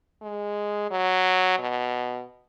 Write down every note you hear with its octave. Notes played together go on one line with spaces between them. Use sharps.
G#3
F#3
B2